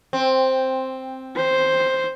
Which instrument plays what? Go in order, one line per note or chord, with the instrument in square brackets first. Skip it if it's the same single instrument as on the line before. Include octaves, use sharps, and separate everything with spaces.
[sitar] C4
[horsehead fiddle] C5